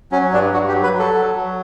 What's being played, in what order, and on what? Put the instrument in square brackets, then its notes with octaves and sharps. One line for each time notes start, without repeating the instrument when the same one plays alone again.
[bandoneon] F#3 C#4
G2 D4
G2 F#4
G4
F#3
B4
F#3
A4
F#3
F#3